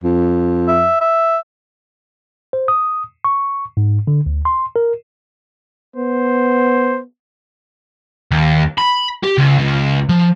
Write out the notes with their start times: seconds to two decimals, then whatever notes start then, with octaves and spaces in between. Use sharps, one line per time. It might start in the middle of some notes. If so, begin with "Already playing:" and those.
0.03 F2
0.68 E5
1.01 E5
2.53 C5
2.68 D#6
3.25 C#6
3.77 G#2
4.07 D3
4.26 D2
4.45 C6
4.76 A#4
5.96 B3 C5
8.31 D#2
8.78 B5
9.23 G4
9.38 C#2
9.58 C#2
10.09 F3